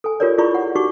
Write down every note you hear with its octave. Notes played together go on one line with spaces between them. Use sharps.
A4 G#5
F4 G4 A#4 C#5 D5
E4 F4 G#4 D5 B5 C#6
F#5
D#4 F#4 G4 C#6 D6